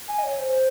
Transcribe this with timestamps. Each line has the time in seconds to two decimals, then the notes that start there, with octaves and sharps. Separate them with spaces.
0.08 G#5
0.19 D#5
0.24 C#5
0.39 C5